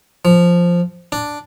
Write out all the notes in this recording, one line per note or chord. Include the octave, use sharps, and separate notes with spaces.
F3
D4